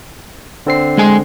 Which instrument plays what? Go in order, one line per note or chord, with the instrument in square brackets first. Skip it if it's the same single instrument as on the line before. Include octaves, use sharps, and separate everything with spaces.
[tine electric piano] D3 C4 C7
[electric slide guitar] G#3 G#4 G#5